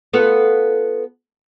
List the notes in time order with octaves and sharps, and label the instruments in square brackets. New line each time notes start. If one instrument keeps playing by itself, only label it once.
[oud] B3 F4 A4